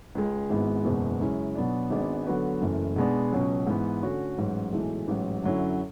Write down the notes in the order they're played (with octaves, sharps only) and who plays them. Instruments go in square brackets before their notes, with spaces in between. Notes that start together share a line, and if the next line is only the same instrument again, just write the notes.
[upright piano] C#2 C#3 G#3
G#1 G#2 G#3 B3 E4
F#1 E2 B2 G#3
F#2 C#3 G#3 C#4 E4
B2 F#3 B3 D4
G#1 G#2 G#3 B3 D4
D3 F#3 B3 F#4 B4
F#1 F#2 E3 A3
B2 G#3 B3 D4
C#2 B2 F#3 C#4
G#2 E3 B3
D3 A3 C#4 F#4
A1 G#2 F#3
B1 A2 E3 G#3
A1 G#2 F#3
F#2 D3 F#3 C#4 E4